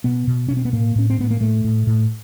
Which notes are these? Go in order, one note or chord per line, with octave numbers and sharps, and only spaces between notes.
B2 B3
B2
B2 C#4
C4
B3
A2 A#3
A2 C#4
C4
A2 B3
A#3
A2 A3
A2
A2